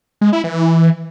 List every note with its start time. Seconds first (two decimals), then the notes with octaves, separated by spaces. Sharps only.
0.21 G#3
0.33 E4
0.44 E3